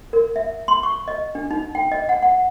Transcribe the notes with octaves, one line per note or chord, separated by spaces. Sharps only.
A#4
E5
C6
C#6
D#5
D4
D#4
G5
D#5
F#5
F#5